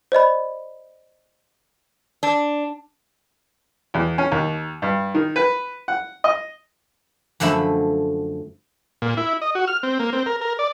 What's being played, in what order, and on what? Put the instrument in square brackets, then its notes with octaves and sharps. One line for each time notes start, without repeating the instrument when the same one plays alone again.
[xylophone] C5 D5 D#5 B5
[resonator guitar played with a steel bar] D4
[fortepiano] E2
C#4
D#2
G2
D#3
B4
F#5
D#5
[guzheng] F#2 D3 F3 A3 E5 B5
[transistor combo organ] A#2
E4
D#5
F#4
F6
C4
A#3
C4
A#4
A#4
D5